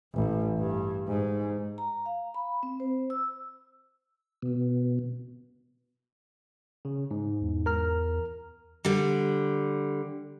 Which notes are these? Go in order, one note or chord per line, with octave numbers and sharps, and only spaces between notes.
A1
G2
G#2
A#5
F5
B5
C4
C5
E6
B2
C#3
G#2
E2
A#4 A#5 F6
D3 G3